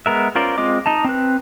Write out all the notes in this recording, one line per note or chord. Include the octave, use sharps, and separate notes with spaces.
G#3 B3 A#4 E5
C#4 F4 A#4 C5 D5
G#3 C4 F4 D#5 D6
D#4 D#5 A5
C4 B4